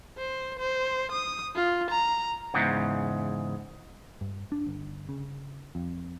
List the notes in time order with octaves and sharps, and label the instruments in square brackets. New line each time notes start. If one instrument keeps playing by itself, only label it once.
[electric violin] C5
C5
D#6
F4
A#5
[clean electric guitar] E2 G#2 C#3
[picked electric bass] G2
D4
G1
C#3
F2